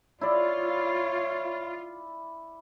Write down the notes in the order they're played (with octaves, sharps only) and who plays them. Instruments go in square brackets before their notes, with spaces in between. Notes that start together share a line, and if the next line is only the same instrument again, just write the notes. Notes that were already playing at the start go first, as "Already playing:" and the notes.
[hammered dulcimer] E4 D5 [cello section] F4 [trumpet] C#5